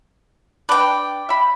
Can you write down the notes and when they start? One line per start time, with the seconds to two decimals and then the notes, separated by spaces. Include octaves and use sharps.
0.69 D4 B4 D5 G5
1.29 E5 B5